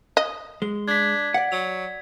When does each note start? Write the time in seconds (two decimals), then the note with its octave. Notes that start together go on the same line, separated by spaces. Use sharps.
0.17 D#5
0.62 G#3 G7
0.88 D4 G#6 B6
1.34 D5 F#5
1.52 F#3 F7